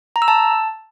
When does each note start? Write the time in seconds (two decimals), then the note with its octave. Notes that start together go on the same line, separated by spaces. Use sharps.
0.16 A#5
0.22 E6
0.28 A5